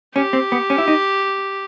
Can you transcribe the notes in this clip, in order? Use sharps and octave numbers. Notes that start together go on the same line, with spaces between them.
C#4 G4
C4
B3
C#4
E4
D#4